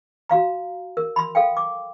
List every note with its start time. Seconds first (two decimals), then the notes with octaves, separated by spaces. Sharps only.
0.29 F#4 F5 A#5
0.97 A#4
1.16 B5 C6
1.35 A4 F5 G5
1.57 D6